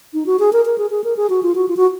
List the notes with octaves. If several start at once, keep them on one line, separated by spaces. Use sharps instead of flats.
D#4
F#4
G#4
A#4
A#4
G#4
G#4
A#4
G#4
F#4
F4
F#4
F4
F#4